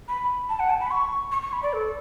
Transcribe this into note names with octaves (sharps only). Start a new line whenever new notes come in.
B5
A5
F#5
A5
B5
C#6
C#6
C#6
B5
D5
A4